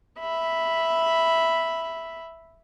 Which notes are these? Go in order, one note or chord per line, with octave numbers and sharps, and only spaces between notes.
E5 B5